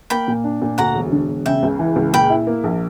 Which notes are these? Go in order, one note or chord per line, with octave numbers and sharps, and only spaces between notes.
A#3 G5 B5
A#2
D4
A#2
D2 F#5 A#5
E1
D3
E1
C#3 E5 G5
C#2
E3
C#2
A#2 G5 B5
E4
A#3
A#1